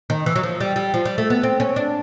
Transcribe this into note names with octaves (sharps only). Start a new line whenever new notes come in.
D#3
E3
F#3
F3
G3
G3
F3
G3
A3
B3
C4
C#4
D4